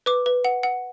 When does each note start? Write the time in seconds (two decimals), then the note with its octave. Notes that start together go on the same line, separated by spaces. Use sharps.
0.06 B4 D6
0.26 B4
0.45 F#5
0.63 F#5